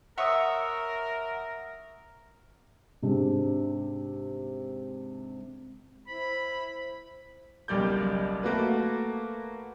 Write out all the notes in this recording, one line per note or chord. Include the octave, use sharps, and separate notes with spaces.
A#4 C#5 E5 F#5 D#6
G#2 C3 D4 G#4
E4 C5 B5
F#1 B1 G3 D5 G6
A3 A#3 F#4 B4